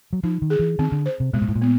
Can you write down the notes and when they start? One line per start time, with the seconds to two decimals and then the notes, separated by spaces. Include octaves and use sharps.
0.13 F#3
0.23 F3 D#4
0.42 D#3
0.50 G#4
0.59 E3
0.79 D#3 C4
0.92 D3
1.06 C5
1.20 C3
1.33 B2 G#3
1.42 A#2
1.49 A2
1.56 A#2
1.61 B3